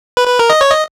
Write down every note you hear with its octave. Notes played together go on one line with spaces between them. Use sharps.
B4
B4
A#4
D#5
C#5
D#5